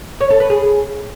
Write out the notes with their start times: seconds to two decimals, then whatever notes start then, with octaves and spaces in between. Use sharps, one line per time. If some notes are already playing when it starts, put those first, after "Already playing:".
0.21 C#5
0.30 A4
0.40 B4
0.50 G#4